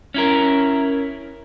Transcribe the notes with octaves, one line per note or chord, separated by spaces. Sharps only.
C#4 E4 A#4